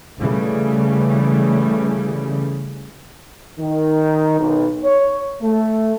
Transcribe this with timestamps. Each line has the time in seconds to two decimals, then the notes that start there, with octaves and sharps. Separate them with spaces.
0.19 C#3 E3 G3 A3
3.60 D#3
4.39 B1
4.84 C#5
5.42 A3